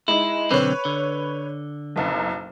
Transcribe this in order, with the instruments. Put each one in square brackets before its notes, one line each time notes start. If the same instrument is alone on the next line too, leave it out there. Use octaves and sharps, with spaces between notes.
[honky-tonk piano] G#3 D#4 [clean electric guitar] E4
[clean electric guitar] B1 D3 C4 [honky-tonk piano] B4 C#5
[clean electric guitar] D3
[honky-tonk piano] F#1 B1 F#2